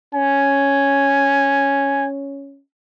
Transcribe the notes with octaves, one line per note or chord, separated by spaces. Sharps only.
C#4 G#5